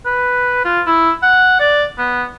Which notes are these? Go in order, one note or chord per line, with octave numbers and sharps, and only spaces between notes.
B4
F4
E4
F#5
D5
B3